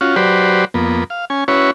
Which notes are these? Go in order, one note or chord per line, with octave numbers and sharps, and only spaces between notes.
C#4 F4 F#4
F#3 F#4 G4 B4 C5 D5
F2 A#3 B3
F5
C#4 G#5
C#4 E4 F#4 B4 C#5